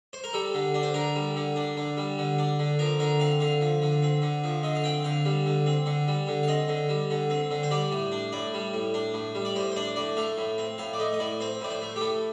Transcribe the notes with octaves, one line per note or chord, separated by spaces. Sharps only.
C5
A#4
G3 A4
D3
D4
C5
D3 A#4
G3
D3
D4
D3
G3
D3
D4
D3
F3 A#4
D3 A#4
C4 F5
D3 F5
F3
D3
C4
D3
F3
D3 D#5
F5
C4 G5
D3 F5
G3
D3
C4
D3
G3
D3
F5
C4 D#5
D3
G3
D3
C4
D3
C5
G3 D5
A2
D4
A2 D5
G3
A2
D4
A2
G3
D5
A2 C5
C5
D4 D5
A2 D5
A3 F5
A2
C4
A2 F5
D5
A3 D#5
D#5
A2 D5
C4 C5
A2 D5
C5
A3
G4
A2 A4